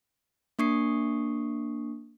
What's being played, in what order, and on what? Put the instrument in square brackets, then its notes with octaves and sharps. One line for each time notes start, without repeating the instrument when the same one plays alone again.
[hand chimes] A#3 D4 C#6 D#6 C7